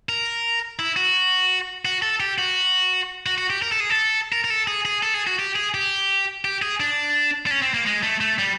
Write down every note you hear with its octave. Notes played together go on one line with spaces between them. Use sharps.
A#4
E4
F#4
F#4
A4
G4
F#4
F#4
F#4
G4
A#4
A4
G#4
A4
A#4
A#4
A4
G#4
G#4
A4
G#4
F#4
G4
G#4
G4
G4
G#4
D4
D4
C#4
C4
A#3
G#3
A3
A3
G3